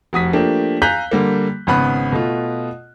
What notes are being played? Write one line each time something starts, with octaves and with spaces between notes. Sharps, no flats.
F1 F#4 D#6 B6
F3 A3 A#3 D4 G4
F5 G#5 A#5 F#6 G6 B6
D3 G3 A#3
G#1 C#3 B3 B5 F#6
B2 A3 F4